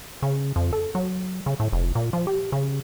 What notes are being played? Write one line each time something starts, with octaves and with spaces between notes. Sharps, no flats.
C#3
F2
A4
F#3
C#3
A2
F1
A#2
F3
G4
C#3